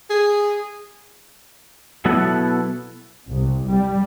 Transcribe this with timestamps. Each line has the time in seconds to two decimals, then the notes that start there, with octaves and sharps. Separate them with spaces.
0.10 G#4
2.05 B2 F#3 B3 E4 A4 F#5
3.31 C2
3.68 G3